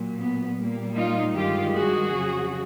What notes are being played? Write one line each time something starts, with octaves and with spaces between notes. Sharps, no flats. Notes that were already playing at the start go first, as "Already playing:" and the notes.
Already playing: A#2 F#3
B3
A#2 G3 A#3
D#4 F4
G2 D#3 G#3 F4 G4
F#4 G#4
F2 C#3 F#3